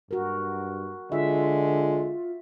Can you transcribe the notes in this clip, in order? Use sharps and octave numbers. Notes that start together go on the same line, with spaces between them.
G2 F#4 A#4
D3 G#3 F4 E5